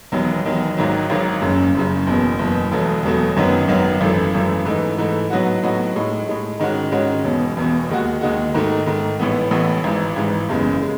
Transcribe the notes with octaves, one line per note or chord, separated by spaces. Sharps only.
E1 E2 D#3 F#3
E1 E2 D#3 F#3
G#1 G#2 D#3 F#3
G#1 G#2 D#3 F#3
F#1 F#2 C#3
F#1 F#2 C#3
F#1 E2 B2
F#1 E2 B2
E1 E2 B2 F#3 A3
E1 E2 B2 F#3 A3
G#1 F#2 D#3 F#3 B3
G#1 F#2 D#3 F#3 B3
G#1 F#2 E3 A3
G#1 F#2 E3 A3
G#2 E3 A3 D#4
G#2 E3 A3 D#4
A2 F#3 B3 D#4 F#4
A2 F#3 B3 D#4 F#4
A2 G#3 D#4
A2 G#3 D#4
G#2 D#3 G#3 C#4 F#4
G#2 D#3 G#3 C#4 F#4
E1 E2 B2
E1 E2 B2
D#2 D#3 G#3 D#4 F#4
D#2 D#3 G#3 D#4 F#4
G#2 D#3 A3
G#2 D#3 A3
A1 A2 E3 B3
A1 A2 E3 B3
G#1 G#2 E3
G#1 G#2 E3
F#1 E2 C#3 G#3
C#3 G#3